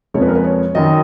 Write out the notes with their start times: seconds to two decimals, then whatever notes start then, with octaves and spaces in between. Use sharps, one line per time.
0.14 F2 C#3 F3 G#3 C#5
0.22 B4
0.28 A#4
0.35 B4
0.45 C#5
0.75 F#2 D#3 F#3 D#5